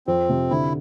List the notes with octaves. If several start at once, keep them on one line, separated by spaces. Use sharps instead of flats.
F2 C4
C3
D3 E4